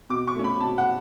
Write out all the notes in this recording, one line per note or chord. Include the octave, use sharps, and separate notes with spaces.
B2 D6
C#6
A3 C#4
B5
B2 A5
F#5